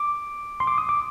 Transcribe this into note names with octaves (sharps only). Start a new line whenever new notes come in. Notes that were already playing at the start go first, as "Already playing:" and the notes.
Already playing: D6
C6
D6
D#6
D6